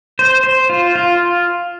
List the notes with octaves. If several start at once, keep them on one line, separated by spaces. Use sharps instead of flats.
C5
C5
F4
F4